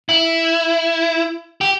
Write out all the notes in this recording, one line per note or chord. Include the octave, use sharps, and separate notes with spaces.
E4
G4